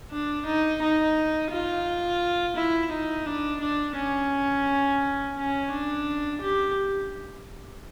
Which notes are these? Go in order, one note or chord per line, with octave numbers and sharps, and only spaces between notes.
D4
D#4
D#4
F4
E4
D#4
D4
D4
C#4
C#4
D4
G4